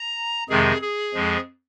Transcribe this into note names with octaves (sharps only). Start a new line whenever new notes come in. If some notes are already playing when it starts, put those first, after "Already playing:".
Already playing: A#5
F2 C3 D#3 G#3 G#4
G#4
F2 F3 G#3